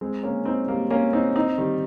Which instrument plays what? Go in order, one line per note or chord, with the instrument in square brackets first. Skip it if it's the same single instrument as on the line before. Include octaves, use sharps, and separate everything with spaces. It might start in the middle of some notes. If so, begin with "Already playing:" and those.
[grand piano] G#3 C4
A#3 C#4
C4 D#4
G3 A#3
A#3 C#4
C4 D#4
C4 D#4
D#3 G3